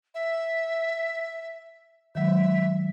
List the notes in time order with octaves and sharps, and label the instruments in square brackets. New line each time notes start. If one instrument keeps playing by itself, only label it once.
[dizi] E5
[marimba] D#3 F#3 G#3 [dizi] E5